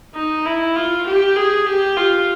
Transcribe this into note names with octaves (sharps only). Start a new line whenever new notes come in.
D#4
E4
F4
G4
G#4
G4
F4